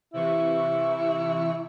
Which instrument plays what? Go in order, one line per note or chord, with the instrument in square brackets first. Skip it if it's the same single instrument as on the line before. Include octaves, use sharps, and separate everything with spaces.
[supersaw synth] C3 E3 C#6 [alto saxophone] E4